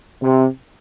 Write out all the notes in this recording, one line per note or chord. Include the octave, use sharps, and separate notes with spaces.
C3